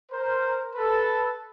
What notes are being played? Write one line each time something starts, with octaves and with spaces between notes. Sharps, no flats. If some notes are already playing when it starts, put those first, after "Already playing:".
A#4 C5
A4 B4